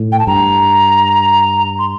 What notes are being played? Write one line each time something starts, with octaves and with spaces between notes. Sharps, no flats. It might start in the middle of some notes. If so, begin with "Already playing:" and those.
Already playing: A2
G5
A5
G2 A#5
C6